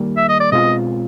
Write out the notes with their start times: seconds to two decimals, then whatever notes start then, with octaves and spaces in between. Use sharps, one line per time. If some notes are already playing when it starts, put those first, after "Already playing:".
Already playing: D#3 G3 A#3
0.17 E5
0.29 D#5
0.40 D5
0.52 B2 G#3 C4 F4 D#5